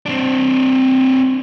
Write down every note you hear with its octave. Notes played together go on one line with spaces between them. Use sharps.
C4 D4